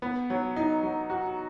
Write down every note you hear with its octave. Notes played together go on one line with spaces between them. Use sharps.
B3
F#3
D#4
F#3
F#4